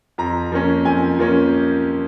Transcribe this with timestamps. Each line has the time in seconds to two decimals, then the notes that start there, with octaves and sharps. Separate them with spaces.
0.18 F2 A#5
0.52 F3 A#3 C#4
0.85 F2 G#5
1.19 F3 A#3 C#4